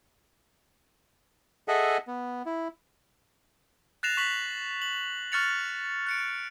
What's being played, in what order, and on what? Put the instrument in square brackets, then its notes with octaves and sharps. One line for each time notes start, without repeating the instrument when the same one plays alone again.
[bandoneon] G#4 A4 D#5 E5 F#5 G#5
B3
E4
[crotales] F#6 A6 A#6 C7 E7 F7
C#6 B6 F#7
F#7
C#6 F6 F#6 A6 C#7 F7
F#6 C#7 D7